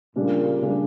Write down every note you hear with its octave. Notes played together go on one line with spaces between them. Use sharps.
A#2 C#3 G3 D4
C#3 G3 D4